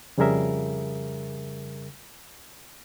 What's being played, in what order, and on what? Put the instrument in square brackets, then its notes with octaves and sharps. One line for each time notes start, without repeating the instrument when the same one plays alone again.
[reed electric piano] F2 C#3 G3 G#4 A#4 E5